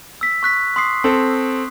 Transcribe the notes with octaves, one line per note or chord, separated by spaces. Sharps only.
E6 B6
C#6 F#6 B6
C6 D#6 C7
C4 A4